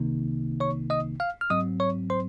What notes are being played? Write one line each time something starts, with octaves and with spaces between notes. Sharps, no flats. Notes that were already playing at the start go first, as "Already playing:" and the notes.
Already playing: C2 C3 D#3 A#3 D#4
C#5 C#6
D#5 D#6
F5 F6
F6
G#2 F#3 C4 D#5 D#6
C#5 C#6
C5 C6